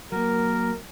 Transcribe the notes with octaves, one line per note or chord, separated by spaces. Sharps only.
F#3 A#3 A#4